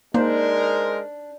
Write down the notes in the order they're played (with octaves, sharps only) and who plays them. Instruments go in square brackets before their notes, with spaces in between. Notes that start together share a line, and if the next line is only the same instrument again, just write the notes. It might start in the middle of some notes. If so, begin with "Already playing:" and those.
[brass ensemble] G#3 A#4 [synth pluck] A#3 [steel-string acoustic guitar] D4 [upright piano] D#4 C5